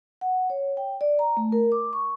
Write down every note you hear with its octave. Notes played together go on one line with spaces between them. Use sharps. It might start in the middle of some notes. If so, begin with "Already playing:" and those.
F#5
C#5
G5
D5
A#5
A3
A#4
D6
C#6